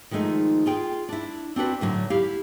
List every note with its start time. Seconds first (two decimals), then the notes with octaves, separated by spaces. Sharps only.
0.11 D#3 F3 G#3 A3 D#4
0.66 F4 G#4 G5
1.09 D4 E4
1.56 C4 D4 F#4 B4
1.81 A2 D3 F#3
2.10 E4 G4 F5